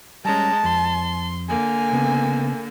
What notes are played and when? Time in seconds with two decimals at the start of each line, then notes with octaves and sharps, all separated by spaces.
0.25 G3 G#3 C#4 A5 A#5
0.64 F2 C6
1.49 D3 A#3 G#5
1.93 C#3 B3